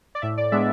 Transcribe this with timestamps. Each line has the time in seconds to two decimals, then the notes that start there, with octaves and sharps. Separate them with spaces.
0.15 D5
0.22 A2 E5
0.38 D5
0.52 G#3 B3 D4 E5